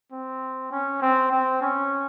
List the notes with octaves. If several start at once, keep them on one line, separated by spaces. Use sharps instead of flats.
C4
C#4
C4
C4
C#4